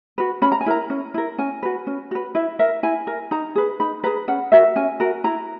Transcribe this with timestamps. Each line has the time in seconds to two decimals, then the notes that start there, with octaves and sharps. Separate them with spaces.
0.18 F#4 B4
0.42 C#4 B5
0.52 A#5
0.61 G#5
0.66 E4 A#4 A#5
0.90 C#4
1.14 E4 A#4
1.38 C#4 G#5
1.63 F#4 B4
1.87 C#4
2.11 F#4 B4
2.35 E4 E5
2.59 A#4 E5
2.83 E4 G#5
3.07 A#4
3.31 D#4 A#5
3.56 G#4 B4
3.80 D#4 B5
4.04 G#4 B4 A#5
4.28 C#4 F#5
4.52 F#4 A#4 E5
4.76 C#4 G#5
5.00 F#4 A#4
5.24 E4 A#5